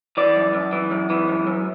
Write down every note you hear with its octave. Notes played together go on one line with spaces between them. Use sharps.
E3 D5
F#2
F#2
E3
F#2
E3
F#2
F#2